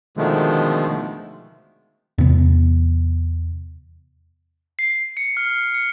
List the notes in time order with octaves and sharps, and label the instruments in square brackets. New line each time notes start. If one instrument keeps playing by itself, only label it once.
[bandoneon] B2 D3 D#3 F3 G#3 A3
[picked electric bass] E2 C3 B3
[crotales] C7
C#7
F6
C#7